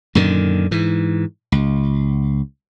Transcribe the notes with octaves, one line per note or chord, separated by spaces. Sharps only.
F#2 A#2 D3 D#3
G#2 E3
C#2